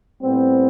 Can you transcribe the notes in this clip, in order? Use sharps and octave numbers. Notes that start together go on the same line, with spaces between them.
A2 G3 B3 C4